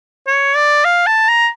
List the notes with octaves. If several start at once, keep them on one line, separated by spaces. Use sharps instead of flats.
C#5
D5
F5
A5
A#5